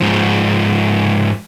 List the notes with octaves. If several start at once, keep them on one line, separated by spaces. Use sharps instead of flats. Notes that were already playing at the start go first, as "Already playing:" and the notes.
G#2 F3